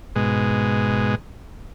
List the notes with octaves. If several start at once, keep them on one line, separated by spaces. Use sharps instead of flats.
G#2 B2 G#3